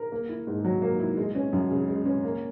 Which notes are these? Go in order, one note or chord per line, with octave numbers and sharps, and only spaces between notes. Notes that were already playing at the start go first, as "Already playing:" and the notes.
Already playing: A#4
A#3
E4
G#2
F#3
A#3
E4
G#3
C#4
F#2
C#3
G#3
C#4
A#3